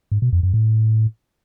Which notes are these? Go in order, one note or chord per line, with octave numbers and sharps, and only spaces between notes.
G#2
B2
F2
F#2
A2